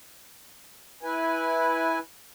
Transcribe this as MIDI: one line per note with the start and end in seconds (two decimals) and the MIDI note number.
1.03 1.99 64
1.03 1.99 71
1.03 1.99 80